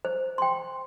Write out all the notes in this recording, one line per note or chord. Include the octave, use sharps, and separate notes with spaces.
C5
G5 C6